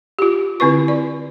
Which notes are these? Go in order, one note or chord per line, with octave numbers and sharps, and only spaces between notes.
F4 G4
D3 C4 E4 B4 C#6
D5